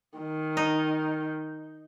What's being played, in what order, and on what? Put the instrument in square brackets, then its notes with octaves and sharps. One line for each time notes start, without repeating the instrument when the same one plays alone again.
[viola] D#3
[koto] D#4